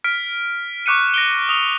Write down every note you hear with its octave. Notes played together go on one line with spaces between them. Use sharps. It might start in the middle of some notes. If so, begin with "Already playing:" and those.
F6 B6 D7
C#6 D6 F#6 C#7 D#7
A#6 D7 G7
D#6 F7